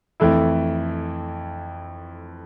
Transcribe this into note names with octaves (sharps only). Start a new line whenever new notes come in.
F2 E3 A3 E4